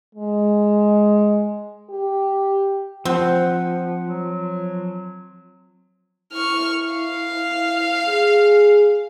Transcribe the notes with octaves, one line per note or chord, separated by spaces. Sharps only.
G#3
G4
F3 C4 F#5
F#3
E4 C#6 F6
F5
G#4